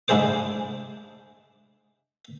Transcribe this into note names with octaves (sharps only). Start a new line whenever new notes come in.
G#2 D4 E4 G#4 C5 D6